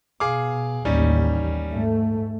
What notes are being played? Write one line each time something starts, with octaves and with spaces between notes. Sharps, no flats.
B2 G#4 F5 D6
A1 D#2 G3 C#4 D#4
G#2 A3